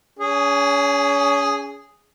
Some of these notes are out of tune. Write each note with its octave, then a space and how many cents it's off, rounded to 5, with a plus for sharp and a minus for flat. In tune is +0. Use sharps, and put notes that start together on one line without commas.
C#4 +30 G#4 -5